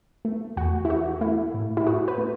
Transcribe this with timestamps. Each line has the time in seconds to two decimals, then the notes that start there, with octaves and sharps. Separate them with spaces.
0.25 A3
0.57 E2 F#4
0.85 E4
0.89 E3 F#4
1.21 A3 E4
1.54 A2
1.77 E4
1.86 A2 F#4
2.08 B4
2.18 A3